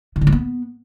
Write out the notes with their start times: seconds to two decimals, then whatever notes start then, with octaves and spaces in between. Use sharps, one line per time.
0.16 C#3
0.21 D3
0.27 F#3
0.32 B3